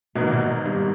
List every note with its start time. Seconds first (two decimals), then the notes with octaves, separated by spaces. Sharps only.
0.15 G#1 G#2 B2 E3 A#3
0.32 B2
0.66 G2